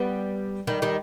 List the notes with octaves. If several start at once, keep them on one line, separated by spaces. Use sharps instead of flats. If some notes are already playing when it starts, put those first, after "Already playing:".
Already playing: G3 B3
D#3 G3
D#3 G3